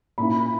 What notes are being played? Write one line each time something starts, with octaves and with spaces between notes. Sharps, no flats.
A#2 A#3 C#4 E4 B5